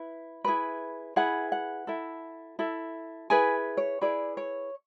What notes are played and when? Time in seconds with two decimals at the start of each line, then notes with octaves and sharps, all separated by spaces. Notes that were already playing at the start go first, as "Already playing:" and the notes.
Already playing: E4 B4
0.44 E4 G#4 B4
1.16 E4 G#4 B4 F#5
1.52 F#5
1.87 E4 A4
2.59 E4 A4
3.30 E4 G#4 B4 G#5
3.77 C#5
4.01 E4 G#4 B4 D5
4.37 C#5